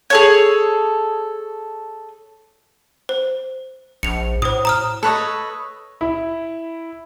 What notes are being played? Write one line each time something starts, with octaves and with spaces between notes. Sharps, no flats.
G#4 A4 C#5
C5
A#1 C#7 F7
A2 C5 D#6
A#5 D#6 F6
A4 B4 C#5 D#5
E4